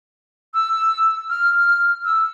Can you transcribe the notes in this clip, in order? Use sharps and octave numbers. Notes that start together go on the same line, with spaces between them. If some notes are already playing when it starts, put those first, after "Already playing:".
E6
F6
E6